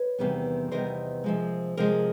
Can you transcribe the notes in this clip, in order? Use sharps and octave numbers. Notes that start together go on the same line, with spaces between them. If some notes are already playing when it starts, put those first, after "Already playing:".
Already playing: B4 C#5
E2 C3 D#3 G3 B3
E2 C3 D#3 G3 B3 A#4 C5
C3 F3 G#3
C3 F3 G#3 A#4 C5